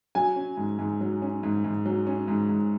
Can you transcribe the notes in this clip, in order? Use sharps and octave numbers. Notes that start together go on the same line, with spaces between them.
F#3 G#5
C#4
G#2
G#2
F#3
C#4
G#2
G#2
F#3
C#4
G#2
G#2